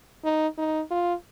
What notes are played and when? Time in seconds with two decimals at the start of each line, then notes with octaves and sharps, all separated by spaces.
0.24 D#4
0.58 D#4
0.91 F4